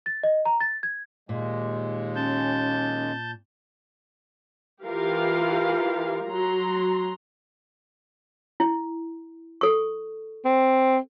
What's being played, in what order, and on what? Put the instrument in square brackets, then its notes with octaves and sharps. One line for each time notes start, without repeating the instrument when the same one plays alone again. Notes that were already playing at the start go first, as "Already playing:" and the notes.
[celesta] A6
D#5
A#5
A6
G#6
[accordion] D#2 G#3 [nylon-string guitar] A#2
[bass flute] C#4 [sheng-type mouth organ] A5 G6
[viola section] E3 F4 G4 A#4 F5
F#3 A#5 C6
[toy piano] E4
A4 C#6
[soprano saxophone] C4